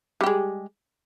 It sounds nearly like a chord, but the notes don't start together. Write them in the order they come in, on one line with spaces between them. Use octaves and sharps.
G3 G4 G#3